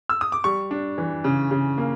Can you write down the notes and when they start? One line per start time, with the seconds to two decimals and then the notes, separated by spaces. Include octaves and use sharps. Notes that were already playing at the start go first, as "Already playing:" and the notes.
0.09 E6
0.21 D#6
0.32 D6
0.44 G3 C#6
0.71 D4
0.98 E3
1.24 C#3
1.51 C#3
1.78 A#3